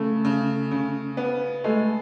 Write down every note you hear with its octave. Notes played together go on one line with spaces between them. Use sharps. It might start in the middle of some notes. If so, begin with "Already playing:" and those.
Already playing: C#3 A3
C#3
C#3
B3
G#3 A3